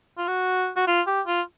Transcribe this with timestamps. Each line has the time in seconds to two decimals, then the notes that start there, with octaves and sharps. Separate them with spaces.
0.18 F4
0.28 F#4
0.77 F#4
0.87 F4
1.07 G4
1.27 F4